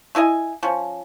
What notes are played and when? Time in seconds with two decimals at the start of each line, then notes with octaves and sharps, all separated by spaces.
0.15 A3 E4 D#5 G#5
0.63 F3 C#4